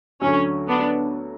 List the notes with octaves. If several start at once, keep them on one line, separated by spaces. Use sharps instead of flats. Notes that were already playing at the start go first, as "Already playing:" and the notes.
D2 D3 F#3 C#4
B3 D4